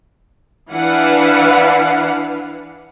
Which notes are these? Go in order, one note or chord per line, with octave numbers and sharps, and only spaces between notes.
E3 D4 E4 B4 F5 F#5